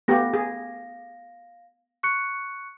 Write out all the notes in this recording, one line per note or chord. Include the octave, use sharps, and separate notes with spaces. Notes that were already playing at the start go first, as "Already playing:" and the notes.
A3 B3 G4 F5 A#6
G#4
C#6 F#6 C#7